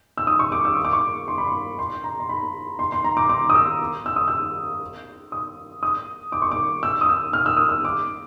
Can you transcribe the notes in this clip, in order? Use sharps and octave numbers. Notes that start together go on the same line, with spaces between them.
E6
D#6
C#6
D6
E6
C#6
D6
C#6
C6
B5
C6
C6
A#5
C6
B5
C6
C6
A#5
D6
D6
D#6
E6
E6
D#6
E6
D#6
D#6
D6
C#6
D6
E6
D#6
E6
F6
E6
D#6
E6
D6